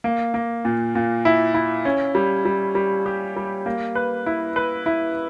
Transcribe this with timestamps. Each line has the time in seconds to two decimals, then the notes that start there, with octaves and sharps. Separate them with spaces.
0.04 A#3
0.34 A#3
0.65 A#2
0.95 A#2
1.25 E4
1.54 E4
1.85 C#4
2.15 G3
2.45 G3
2.75 G3
3.06 G4
3.36 G3
3.66 A#3
3.95 B4
4.26 E4
4.56 B4
4.86 E4